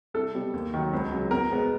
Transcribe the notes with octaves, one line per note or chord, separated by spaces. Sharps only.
C2 A4
B2 G3
D#2
D#3 F#3
C#2
C#3 F#3
E2 A#4
B2 G#3 B3